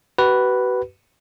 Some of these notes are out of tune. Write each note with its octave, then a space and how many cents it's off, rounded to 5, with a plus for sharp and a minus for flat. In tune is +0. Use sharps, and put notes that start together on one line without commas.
F#4 +40 B4 +0